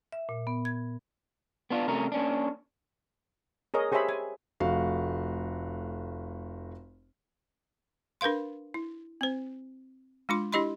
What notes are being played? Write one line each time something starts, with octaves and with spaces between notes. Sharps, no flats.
E5
A#2
B3
G#6
B3 D4 F4
C3 A3 C#4 A#4
A#3 C#4 D4
G#4 A#4 C#5 D#5
G4 G#4 C5 C#5 E5 B5
G#5
F1 A3 F#4 F5
D4 A#4 B4 F5 C6
E4
C4 C5
G#3 D4 F4 C6
D4 E4 G4 D#5 B5 C6